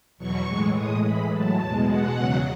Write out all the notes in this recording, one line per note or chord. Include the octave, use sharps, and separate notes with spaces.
E2 B2 F#3 C#6
A2 E3 G#3
A2 G#3 D#6
A2 E3 G#3 B5
A2 F#3 A5
E2 B2 G#3
B2 G#3 F#5
E2 C#3 F#3